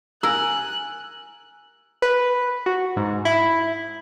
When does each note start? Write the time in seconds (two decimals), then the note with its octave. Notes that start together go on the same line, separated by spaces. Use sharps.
0.23 A#4 G#5 E6 F#6
2.02 B4
2.66 F#4
2.96 G#2
3.25 E4